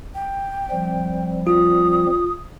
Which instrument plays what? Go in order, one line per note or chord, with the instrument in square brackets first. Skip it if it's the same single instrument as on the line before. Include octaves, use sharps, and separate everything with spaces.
[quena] G5
[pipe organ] F3 G3 C4
[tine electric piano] F4 [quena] D#6